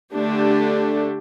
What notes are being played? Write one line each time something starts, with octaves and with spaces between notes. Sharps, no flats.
D3 A3 D4 G4